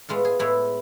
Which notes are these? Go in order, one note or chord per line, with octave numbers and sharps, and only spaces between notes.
A2 G#3 B3 F4
G#4
A2 G#3 B3 E4